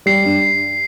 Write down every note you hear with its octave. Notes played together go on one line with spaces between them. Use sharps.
G3 C7
G2